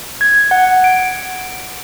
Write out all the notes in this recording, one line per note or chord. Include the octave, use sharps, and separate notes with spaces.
G#6
F#5
D7